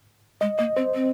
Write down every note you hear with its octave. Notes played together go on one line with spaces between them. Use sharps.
G#3 D#5
A#3 D#5
C4 C5
C4